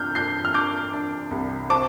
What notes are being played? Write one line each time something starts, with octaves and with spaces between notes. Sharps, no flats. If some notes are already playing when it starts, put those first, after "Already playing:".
Already playing: C3 D4 F6 G6
D4 G6 C7
F6
D4 D6 G6
D4
C2
C4 A5 D6